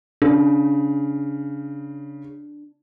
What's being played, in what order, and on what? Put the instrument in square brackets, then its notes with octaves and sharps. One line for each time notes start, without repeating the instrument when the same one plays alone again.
[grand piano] C#3 [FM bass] D4